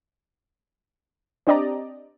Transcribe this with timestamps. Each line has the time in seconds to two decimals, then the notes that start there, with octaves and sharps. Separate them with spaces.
1.47 C4 D4 G4 D5 D#5 A#5